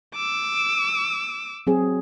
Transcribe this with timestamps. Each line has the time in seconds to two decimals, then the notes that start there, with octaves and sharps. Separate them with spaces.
0.16 D6 E6
1.67 F#3 C4 G#4